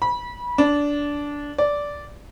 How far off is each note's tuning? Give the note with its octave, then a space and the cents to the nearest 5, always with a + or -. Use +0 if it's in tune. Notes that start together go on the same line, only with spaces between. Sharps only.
B5 -25
D4 -15
D5 -10